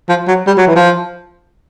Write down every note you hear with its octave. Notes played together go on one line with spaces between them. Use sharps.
F3
F#3
G3
F#3
E3
F3